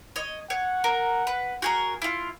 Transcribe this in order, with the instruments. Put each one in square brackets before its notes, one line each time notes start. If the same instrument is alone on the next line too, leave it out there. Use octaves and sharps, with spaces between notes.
[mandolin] C#5 D#5
[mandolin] C#5 [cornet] F#5
[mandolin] A#4
B4
F#4 G#4 A#4
E4 F4